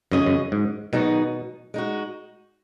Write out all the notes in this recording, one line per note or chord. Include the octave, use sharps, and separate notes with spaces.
F#2 C#3 F#3 C#4 G#4 D#5
F#2
G#2
B2 D#3 F#3 B3 D#4 G#4
G#3 D#4 F#4